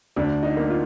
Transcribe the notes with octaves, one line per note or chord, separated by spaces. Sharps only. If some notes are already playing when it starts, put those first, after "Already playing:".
D2 D4
D#4
A#3
F4